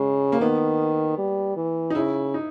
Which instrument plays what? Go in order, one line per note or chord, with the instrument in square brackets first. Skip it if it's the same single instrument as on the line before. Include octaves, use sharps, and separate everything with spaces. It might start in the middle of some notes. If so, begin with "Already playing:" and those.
Already playing: [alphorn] C#3 [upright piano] G#3
[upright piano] A#3
[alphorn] D#3 [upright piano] B3
[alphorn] G3
E3
[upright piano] D#4
[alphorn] C#3 [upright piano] E4
[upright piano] D#4